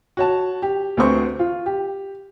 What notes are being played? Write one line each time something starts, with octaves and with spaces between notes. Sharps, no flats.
F#4 C#5 A5
G4
D2 A3 C4 B4 C5 C#6
F4
G4